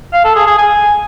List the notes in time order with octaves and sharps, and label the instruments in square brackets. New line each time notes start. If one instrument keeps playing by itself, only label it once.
[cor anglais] F5
A4
G#4
G#4
G#5